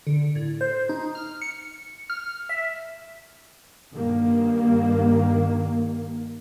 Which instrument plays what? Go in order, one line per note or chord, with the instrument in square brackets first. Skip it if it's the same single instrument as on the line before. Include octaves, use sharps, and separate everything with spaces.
[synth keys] D3
A2
C5
D#4
F6
C#7
F6
E5
[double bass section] G2 D#3 A#3